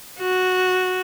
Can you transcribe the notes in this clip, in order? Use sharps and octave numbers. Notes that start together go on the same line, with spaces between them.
F#4